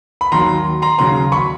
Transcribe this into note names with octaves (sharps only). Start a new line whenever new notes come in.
B5
D#2 D#3 F#3 A#5 C6
A#5 C6
D#2 C#3 F#3 A#5 C6
B5 C#6